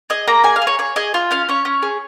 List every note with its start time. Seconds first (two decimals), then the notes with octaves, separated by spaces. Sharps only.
0.10 G#4 D#5
0.28 A#3 A#5
0.44 G#4 G#5
0.56 F5
0.62 G#4
0.67 C#5
0.79 G#4 C#5
0.96 G#4 D#5
1.14 F4
1.31 C#4 F5
1.49 C#4 C#5
1.65 C#4
1.82 G#4